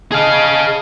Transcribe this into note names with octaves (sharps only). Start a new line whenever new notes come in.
G#4 D#5 F5 A5